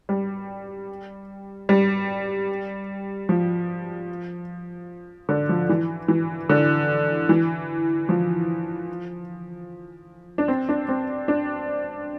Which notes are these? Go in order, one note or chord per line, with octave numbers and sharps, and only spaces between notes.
G3
G3
F3
D3
F3
E3
E3
D3
E3
F3
D4
C4
D4
C4
D4